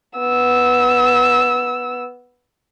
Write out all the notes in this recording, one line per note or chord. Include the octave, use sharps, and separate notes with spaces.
B3 E6